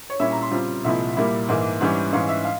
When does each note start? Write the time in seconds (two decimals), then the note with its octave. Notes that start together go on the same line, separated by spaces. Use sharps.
0.10 C#5
0.20 A#2 G3 C#4 E4 E5
0.31 A#5
0.42 C6
0.51 C#3 G3 C4 F4
0.84 C2 A#2 F3 G#3 E4 E5
1.17 A#2 G3 A#3 E4
1.48 G#2 E3 A#3
1.81 G#2 E3 G3 C#4
2.12 G#2 E3 G#3 C#4 F5
2.29 E5
2.45 F5